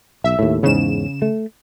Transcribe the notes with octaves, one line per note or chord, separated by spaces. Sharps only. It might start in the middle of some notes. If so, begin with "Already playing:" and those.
B1 E5
D#2 A2
E2 G#2 C#3 E7
A3